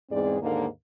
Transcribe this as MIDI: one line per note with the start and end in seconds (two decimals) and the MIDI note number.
0.10 0.38 40
0.10 0.38 44
0.10 0.38 56
0.10 0.38 60
0.10 0.38 68
0.10 0.38 74
0.42 0.66 39
0.42 0.66 44
0.42 0.66 50
0.42 0.66 58